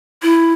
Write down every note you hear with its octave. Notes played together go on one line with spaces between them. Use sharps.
E4